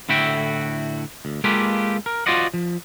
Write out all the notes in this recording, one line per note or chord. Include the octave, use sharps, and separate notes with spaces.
A2 D3 E4 F#4 E5 G5
D2
G#3 A#3 F4 G4 A4 B4
A#4
F4 F#4 C5 D5 D#5 F#5
F3